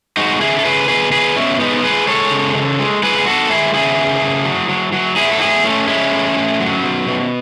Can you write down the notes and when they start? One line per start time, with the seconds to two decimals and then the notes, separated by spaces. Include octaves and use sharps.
0.17 G#3 D#4 F#4
0.40 C#3 E4 G#4
0.59 A4
0.65 C#3 G#4 B4
0.88 B2 G#4 B4
1.12 B2 G#4 B4
1.36 B2 C#4 E4
1.59 G#3 B3 D#4
1.83 G#3 G#4 B4
2.07 G#3 A4 C#5
2.31 C#3
2.55 C#3
2.79 G#3
3.03 G#3 G#4 B4
3.18 G#4
3.26 B2 F#4 A4
3.50 G#3 E4 G#4
3.73 C#3 E4 G#4
3.97 C#3
4.21 C#3
4.45 F#3
4.69 F#3
4.92 F#3
5.16 F#3 E4 G#4
5.32 A4
5.40 A2 E4 G#4
5.64 A2 A3 C#4
5.87 G#3 C#4 E4
6.12 A2
6.36 A2
6.60 F#3
6.83 B2
7.07 B2